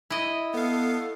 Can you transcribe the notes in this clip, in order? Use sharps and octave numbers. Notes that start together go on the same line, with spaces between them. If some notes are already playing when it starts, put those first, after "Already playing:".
E4 D#5
B3 A4 F5